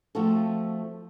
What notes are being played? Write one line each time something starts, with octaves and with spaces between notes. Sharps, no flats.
F3 A3 C4 F4 F#4 A4